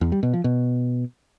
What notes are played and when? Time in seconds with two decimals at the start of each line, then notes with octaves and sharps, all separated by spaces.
0.01 E2
0.12 G3
0.23 B2
0.34 F3
0.44 B2